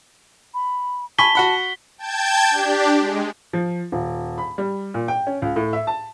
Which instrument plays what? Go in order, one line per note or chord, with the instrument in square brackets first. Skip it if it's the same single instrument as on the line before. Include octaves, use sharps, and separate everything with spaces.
[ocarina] B5
[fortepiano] G#5 B5 C#6 [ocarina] A5 [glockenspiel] B6 G7
[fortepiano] F#4 F#5 B5
[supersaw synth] G5 A5 G6 G#6
D4 G4
G#3
[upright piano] F3
D#1
B5
G3
A#2
G5
C#4
C#2
A2
E5
A5